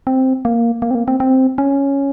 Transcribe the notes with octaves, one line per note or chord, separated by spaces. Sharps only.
C4
A#3
A#3
C4
A#3
C4
C4
C#4